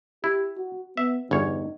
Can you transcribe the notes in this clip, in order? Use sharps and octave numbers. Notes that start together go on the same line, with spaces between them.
E4 G4
F#4
B3 E5
G1 E2 D#4 C#5